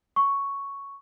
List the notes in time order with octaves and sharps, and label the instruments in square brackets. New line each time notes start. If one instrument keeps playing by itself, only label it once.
[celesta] C#6